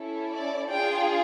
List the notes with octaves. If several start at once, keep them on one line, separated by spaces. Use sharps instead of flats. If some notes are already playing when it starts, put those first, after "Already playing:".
Already playing: C#4 E4 A4
D5
D4 F4 G#4 G5